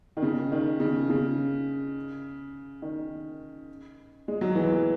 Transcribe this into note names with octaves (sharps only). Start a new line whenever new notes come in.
D#3
C#3
D#3
C#3
C#3
D#3
G#3
F#3
E3